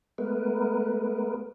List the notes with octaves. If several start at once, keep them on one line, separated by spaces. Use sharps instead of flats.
G#3 A3 B3 A#4 B4